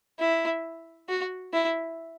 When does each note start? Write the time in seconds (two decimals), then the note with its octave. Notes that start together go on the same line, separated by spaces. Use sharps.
0.20 E4
1.09 F#4
1.53 E4